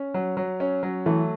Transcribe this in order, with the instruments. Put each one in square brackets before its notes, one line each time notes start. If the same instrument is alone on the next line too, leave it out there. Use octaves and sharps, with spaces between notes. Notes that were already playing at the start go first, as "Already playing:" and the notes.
Already playing: [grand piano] C#4
F#3
F#3
C#4
F#3
[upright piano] E3 [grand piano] A3